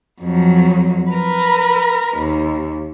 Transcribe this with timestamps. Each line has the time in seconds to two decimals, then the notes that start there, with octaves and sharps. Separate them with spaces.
0.22 F2 F#3
1.10 A#4 B4
2.18 D#2